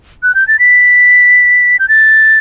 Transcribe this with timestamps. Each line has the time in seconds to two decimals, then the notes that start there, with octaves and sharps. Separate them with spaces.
0.23 F#6
0.35 G6
0.48 A6
0.59 B6
1.80 G6
1.89 A6